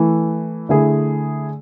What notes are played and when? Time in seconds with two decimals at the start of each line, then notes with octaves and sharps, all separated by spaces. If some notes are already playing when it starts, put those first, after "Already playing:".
Already playing: E3 A3 E4
0.69 D3 A3 E4 G#4